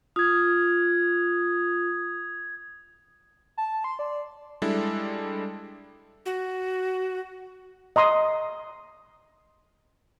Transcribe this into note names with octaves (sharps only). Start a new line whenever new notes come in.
F4 D#6 G#6
A5
C6
D5
G3 G#3 D4 E4 A4
F#4
D#5 A#5 C6 D#6